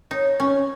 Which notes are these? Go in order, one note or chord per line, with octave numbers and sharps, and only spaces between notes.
D#4 C#5
C#4